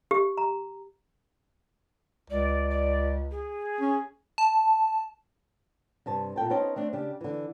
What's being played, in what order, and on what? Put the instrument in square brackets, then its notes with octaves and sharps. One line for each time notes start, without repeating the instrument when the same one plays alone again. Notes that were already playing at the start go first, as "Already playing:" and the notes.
[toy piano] G4
A#5
[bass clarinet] C#2 [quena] D5
[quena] D5
G#4
[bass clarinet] C#4
[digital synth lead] A5
[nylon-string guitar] G2 C3 A5
A#2 A4 G5 A5
B3 C#4 D#4 C5 G5 A5
A3 C4 D4
C#3 D4 G4
D3 E3